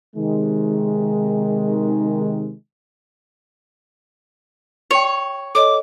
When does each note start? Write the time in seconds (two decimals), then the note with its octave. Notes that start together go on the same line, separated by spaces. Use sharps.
0.16 C3 D#3 G#3
4.91 G4 C#5 G5
5.55 A4 C#5 D#5 D6